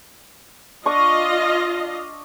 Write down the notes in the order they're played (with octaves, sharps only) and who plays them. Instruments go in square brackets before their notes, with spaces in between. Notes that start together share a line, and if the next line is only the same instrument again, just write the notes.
[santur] D4 C#6 D6 [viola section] F4 D#5